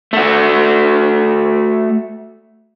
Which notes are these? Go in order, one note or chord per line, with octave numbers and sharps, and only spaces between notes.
A3 F#4